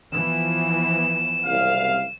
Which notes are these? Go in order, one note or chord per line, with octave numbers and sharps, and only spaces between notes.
E3 F3 B3 E7
F#1 C2 F5